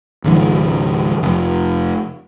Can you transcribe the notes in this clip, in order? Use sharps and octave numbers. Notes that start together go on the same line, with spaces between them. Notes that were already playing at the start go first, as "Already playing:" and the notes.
G#1 C#2 D#3 F3
F1